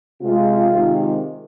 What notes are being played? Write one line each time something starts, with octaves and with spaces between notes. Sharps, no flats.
C3 G#3 F4
C3 D#3 G#3